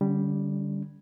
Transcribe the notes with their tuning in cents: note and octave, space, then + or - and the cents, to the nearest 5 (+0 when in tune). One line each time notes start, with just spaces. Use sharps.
D3 +0 G3 +0 C#4 +30